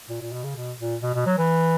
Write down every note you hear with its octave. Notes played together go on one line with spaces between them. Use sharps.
A#2
A#2
B2
C#3
B2
A#2
B2
B2
F#3
E3